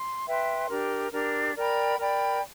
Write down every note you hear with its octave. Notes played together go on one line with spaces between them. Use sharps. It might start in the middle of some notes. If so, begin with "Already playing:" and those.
Already playing: C6
B4 E5 G5 C6
D4 G4 A#4
D4 G4 A#4
A#4 D5 G5 B5
A#4 D5 G5 B5